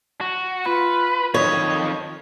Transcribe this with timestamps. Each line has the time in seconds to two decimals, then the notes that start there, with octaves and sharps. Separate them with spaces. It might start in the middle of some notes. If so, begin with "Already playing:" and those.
0.21 F#4
0.66 F4 B4
1.34 F2 D#3 C#5 D#5